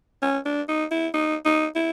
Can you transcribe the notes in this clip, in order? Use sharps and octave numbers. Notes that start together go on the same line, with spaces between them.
C#4
D4
D#4
E4
D#4
D#4
E4